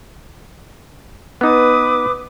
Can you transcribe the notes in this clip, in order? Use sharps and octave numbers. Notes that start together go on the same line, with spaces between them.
B3 D#4 B4 D6 D#6